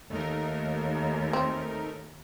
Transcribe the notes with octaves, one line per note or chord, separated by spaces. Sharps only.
D#2 A3 D#4 A#4
C4